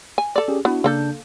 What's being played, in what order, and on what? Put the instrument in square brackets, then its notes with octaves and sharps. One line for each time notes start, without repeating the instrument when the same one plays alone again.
[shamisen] G#5
A4 D5
[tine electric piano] C#4 G4 G#4
[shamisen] B3 [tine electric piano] D4 E4 F#4
[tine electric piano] C#3 D4 G6 [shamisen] A#3 A4